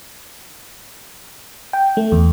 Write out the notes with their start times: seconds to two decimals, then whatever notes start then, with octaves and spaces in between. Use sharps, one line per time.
1.73 G5
1.97 A3
2.12 E2